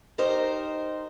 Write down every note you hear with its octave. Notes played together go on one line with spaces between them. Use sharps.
D#4 G4 A#4 C5 D#5